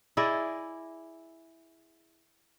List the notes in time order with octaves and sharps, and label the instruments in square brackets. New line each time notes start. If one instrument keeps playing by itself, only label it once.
[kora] E4 G#4 D5 D#5